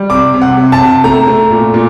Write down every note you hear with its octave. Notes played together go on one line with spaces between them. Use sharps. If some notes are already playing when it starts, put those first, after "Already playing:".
Already playing: G3
C3 D6
C3
F#5
C3
A5
C3
A3 A#5
A3
A#2
A#2